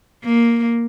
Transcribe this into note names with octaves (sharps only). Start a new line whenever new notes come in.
A#3